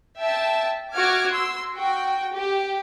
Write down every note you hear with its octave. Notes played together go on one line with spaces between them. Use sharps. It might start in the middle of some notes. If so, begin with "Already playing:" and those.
E5 G5 A5
F#4 D6 F6 G#6
C6 E6
F#4 G5
G4